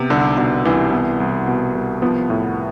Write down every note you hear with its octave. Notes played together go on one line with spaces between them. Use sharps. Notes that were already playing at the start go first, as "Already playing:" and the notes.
Already playing: C3 B3
C2 D3
B2 D3
C2 E3
B3
C2
B2
C2
F3 B3
A2